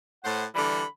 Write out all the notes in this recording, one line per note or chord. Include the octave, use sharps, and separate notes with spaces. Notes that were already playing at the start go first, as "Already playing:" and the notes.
A2 C5 F#5
D3 E3 G3 B5